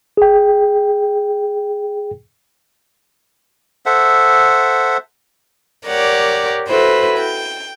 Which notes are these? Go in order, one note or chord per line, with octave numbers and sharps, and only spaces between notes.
G#4 G5
A4 C5 E5 F#5
G4 A#4 C#5 D5 F#5
E4 F#4 A4 B4 C5
G5